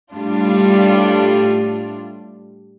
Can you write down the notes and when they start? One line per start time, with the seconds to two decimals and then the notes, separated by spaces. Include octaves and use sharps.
0.13 A2 G3 D4 F4